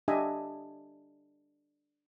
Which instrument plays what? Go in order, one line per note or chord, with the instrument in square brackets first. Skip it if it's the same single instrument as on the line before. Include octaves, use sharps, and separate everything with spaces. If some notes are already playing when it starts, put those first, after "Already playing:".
[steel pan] D4 G4 D#5 E5 G#5